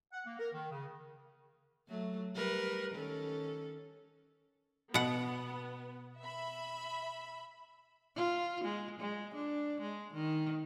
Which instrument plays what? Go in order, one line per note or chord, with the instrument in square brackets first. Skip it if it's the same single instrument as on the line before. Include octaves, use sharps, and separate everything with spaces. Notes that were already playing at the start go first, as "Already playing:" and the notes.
[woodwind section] F#5
A#3
A#4
D#3
C#3
[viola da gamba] F#3 A3
G3 A#4 B4
D#3 C#4 A4
[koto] B2 F#5 [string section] B3
[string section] E5 B5
[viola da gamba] F4
G#3
G#3
D4
G#3
D#3